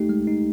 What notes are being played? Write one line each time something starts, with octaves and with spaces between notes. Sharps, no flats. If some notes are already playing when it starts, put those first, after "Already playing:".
Already playing: A3 D#4 G4
G#3
D#4